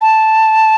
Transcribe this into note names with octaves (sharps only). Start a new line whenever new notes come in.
A5